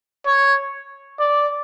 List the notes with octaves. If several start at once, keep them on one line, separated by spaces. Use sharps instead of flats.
C#5
D5